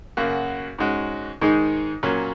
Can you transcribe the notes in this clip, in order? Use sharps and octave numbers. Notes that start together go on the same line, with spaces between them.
F#2 C#3 A#3 F#4
G#2 G#3 C#4 F#4
G#2 D#3 G#3 D#4 G#4
A#2 F#3 A#3 C#4